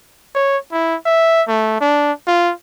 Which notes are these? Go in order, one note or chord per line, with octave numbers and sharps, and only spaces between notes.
C#5
E4
E5
A3
D4
F4